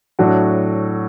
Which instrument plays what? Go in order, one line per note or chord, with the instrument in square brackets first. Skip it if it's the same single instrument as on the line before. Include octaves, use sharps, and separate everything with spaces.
[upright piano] A2 F#3 A3 D4 F#4